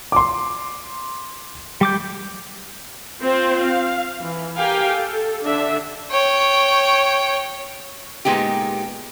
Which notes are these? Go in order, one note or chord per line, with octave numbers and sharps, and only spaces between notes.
C6 D6
G3 D6 G6
C4 F4 C5
F5
E3
G4 A#4 F5 G5 G#5
A4
D3 D4 E5
C#5 G5
A#2 G#3 B3 D#4 G4